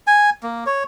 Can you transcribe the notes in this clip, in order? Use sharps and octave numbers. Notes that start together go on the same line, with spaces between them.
G#5
A#3
C#5